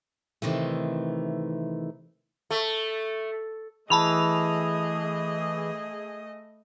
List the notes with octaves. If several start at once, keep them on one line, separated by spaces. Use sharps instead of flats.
C3 D#3 E3 A3
A3
E3 A3 G#4 D#5 A5 B5 F7